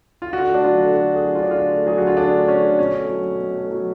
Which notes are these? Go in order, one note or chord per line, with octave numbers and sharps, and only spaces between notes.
F4
D3 F#4
A3
D4
F#3 F4
D3
D3 F#4
A3
G#4
F#3
F4
D3 D4
D3 F4
A3
F#3 G#4
D3 F#4
F4
D3 D4
A3
F#3 C#4
D3
B2 C#4
A3
F#3
B2
B2
A3
F#3